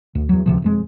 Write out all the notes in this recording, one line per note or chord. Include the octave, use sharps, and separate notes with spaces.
D2
E2 F#3
C#2 C3 F3
E1 F2 G#3